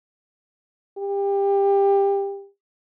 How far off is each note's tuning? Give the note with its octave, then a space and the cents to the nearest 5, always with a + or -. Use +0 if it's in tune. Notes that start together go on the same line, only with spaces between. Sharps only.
G4 +20